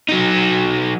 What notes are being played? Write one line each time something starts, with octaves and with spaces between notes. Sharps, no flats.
F#3 D#4